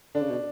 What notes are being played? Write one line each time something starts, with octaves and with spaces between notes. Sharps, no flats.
D3 D4
C#3
B2